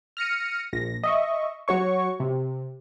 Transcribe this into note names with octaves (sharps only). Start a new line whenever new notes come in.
F6 A#6 C#7 D#7
A#1 A#6
D#5 E5 C#6
F#3 F#4 C#5 C#6
C3